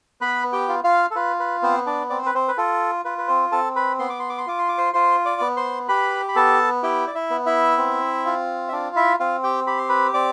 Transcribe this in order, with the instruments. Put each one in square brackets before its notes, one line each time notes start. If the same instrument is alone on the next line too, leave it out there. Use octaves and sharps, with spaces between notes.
[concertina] B3 B4 B5
G4 G5
F4
F4 F5
A4
F4 B4
B4
B3 C4 C5
D4 D5
C4 D5
C5
B4
C4 C5
B4
F4 A4
F4 B4
B4
C4 C5
C4 A4 A5
B4 B5
B3 C6
D6
C6
D6
C6
F4 D6
C6
D6
C5 C6
F4 C5 C6
D5 D6
B3
C5 C6
G4 B4 B5
B5
B3 A4 A5
E4 G4 G5
D5
E4 E5
B3
E4 E5
C4
F4
E5
D4 F4 D5
E4 E5
C4 F4 F5
G4 G5
G4 B5
C6
B4 B5
C4 D5 D6